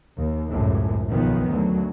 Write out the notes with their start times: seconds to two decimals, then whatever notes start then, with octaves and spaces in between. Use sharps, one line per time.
0.18 D#2
0.51 G#1 C#2 F#2 A2
1.11 B1 D#3 F3 B3
1.52 D2 F#3